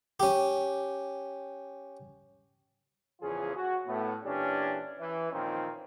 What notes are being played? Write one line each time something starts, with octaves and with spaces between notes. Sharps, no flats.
C#4 G4
E2 C#3 F3 C#4 F4 G#4
F#4
A2 A3 B3
A#2 E3 C#4 D4 G4
E3
A#2 D#3 F3 C4 C#4 D#4